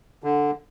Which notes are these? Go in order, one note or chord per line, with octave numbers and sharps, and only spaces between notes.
D3